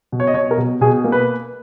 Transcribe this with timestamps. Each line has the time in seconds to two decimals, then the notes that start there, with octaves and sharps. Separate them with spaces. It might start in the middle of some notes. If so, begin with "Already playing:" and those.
0.12 B2
0.20 C#5
0.27 D#5
0.34 B2 C#5
0.51 A#4
0.58 B2
0.81 B2 G#4
1.04 A#3
1.12 B4